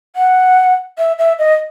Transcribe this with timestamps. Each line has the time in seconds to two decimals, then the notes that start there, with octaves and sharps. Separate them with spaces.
0.16 F#5
0.98 E5
1.19 E5
1.39 D#5